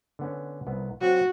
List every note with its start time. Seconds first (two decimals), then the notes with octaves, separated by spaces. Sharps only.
0.19 D3 B3 C#4
0.67 C2 B3
1.01 F#3 C4 F#4